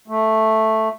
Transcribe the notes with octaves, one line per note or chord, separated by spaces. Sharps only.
A3